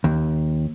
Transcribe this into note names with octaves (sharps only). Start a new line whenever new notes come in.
D#2